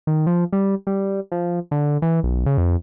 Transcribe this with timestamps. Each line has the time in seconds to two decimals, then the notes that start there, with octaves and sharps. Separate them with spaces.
0.07 D#3
0.27 F3
0.53 G3
0.87 G3
1.32 F3
1.71 D3
2.02 E3
2.23 B1
2.46 C#3
2.58 F2